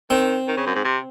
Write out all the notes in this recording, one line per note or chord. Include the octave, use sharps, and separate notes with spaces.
D#3 C4
D#3
C#3
F#2
G#2
C3